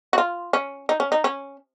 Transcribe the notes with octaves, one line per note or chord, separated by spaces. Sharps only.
F#4
F4
C#4
D#4
C#4
D#4
C#4